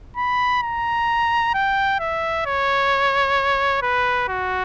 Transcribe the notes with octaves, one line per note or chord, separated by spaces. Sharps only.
B5
A#5
G5
E5
C#5
B4
F#4